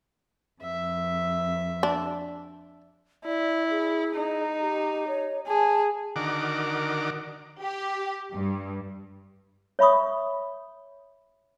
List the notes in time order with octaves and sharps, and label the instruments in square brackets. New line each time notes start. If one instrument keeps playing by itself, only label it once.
[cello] F2 [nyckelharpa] E5
[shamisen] D4
[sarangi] E4 [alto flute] D5
[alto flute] G#4
[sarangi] D#4
[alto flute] G4
C#5
[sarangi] G#4 [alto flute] A5
[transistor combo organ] D3 D#3 F#4 A#4 D6
[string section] G4
G2
[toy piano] C#5 E5 B5 C#6 D#6